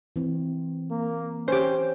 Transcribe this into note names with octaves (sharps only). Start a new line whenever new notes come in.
E3 C4
A#3
C#4 G4 C5